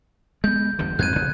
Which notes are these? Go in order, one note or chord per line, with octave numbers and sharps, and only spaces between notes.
G#3 B3 G6
G1 E2 D3
F2 G#2 C4 F#6 G#6 D#7
E1 A#1 C#3